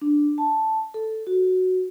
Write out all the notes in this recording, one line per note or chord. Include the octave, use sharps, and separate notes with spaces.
D4
A5
A4
F#4